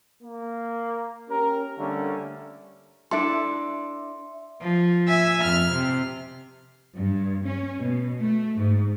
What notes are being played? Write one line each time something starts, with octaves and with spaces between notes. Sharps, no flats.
A#3
C#4 G4 A#4
D3 G3 A3 A#3 C#4
D4 E4 A4 E5 C6
F3
E5 G#5
F2 F6
C3
G2
C#4
B2
A3
G#2